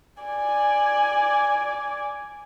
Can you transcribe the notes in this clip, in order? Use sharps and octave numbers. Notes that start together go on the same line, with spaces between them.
D5 G#5